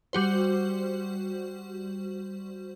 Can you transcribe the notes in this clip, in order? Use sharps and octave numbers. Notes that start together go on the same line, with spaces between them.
G3 F#4 C5